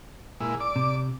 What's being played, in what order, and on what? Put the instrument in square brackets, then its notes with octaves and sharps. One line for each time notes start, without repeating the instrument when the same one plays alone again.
[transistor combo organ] A#2 G#3 E4
D5 D6
[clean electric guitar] C3